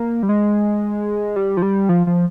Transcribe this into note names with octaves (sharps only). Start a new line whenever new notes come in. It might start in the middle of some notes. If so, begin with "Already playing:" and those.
Already playing: A#3
G3
G#3
G3
F3
G3
F3
F3